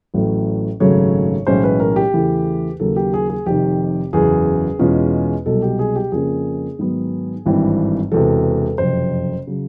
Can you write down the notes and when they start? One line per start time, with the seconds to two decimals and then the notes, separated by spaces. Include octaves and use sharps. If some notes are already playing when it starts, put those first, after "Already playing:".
0.14 A1 A2 F#3 A3
0.80 G#1 F#2 C#3 F#3 A3 C#5
1.47 B1 A2 E3 G#3 C#4 C5
1.64 B4
1.80 A#4
1.96 G4
2.14 E2 C#3 E3 A3
2.80 D#2 C#3 F#3 A#3 A4
2.96 G4
3.14 G#4
3.30 G#4
3.46 F1 F2 C3 D#3 G4
4.13 F#1 E2 C#3 G#4
4.79 E2 B2 G#3 C#4 F4
5.46 C2 B2 F#3 A4
5.62 G4
5.79 G#4
5.96 G4
6.12 F2 C#3 F3 A#3 C#4 G#4
6.79 G#2 D#3 F#3 B3
7.46 G#1 G2 E3 G3 C4
8.12 E1 E2 C3 A4
8.78 F#1 F2 C3 C5
9.47 C#3 F#3